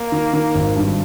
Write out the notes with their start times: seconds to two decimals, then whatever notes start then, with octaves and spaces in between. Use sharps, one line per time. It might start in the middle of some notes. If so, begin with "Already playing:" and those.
Already playing: A#3
0.12 D#3
0.33 D#3
0.55 G#1
0.76 G2